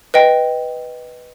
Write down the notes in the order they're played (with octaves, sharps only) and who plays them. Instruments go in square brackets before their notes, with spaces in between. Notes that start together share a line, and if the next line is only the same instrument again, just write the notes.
[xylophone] B4 D#5 G5